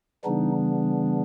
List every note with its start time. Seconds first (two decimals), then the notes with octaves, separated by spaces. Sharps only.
0.25 C#3 E3 G3 B3 D4 D#4